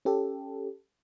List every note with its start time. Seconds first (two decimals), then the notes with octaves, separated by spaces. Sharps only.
0.05 C#4 G4 A4